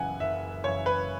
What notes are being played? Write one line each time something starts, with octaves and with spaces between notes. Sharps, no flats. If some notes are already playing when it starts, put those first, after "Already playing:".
Already playing: F#1 F#2 C#3 E3 F#5 G#5
F#1 E5
F#2 C#3 E3 C#5
B4